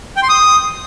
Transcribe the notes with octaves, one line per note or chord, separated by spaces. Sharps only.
G5
C6
D#6